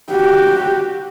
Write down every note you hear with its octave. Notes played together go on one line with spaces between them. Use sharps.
F#4 G4